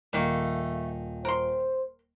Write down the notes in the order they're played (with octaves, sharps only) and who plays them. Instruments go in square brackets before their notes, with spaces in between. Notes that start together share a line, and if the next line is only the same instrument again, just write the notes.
[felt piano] D#1 [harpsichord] D#3 [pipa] A3 A#3
[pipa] A#4 C6 [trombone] C5